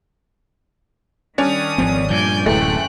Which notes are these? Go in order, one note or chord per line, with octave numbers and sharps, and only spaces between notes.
D#3 G3 C#4 D4 D#6
G#1 F3 C4
G2 A#2 F3 D5 G#5 G6
D1 F#2 E3 G#3 A3 G5 F#6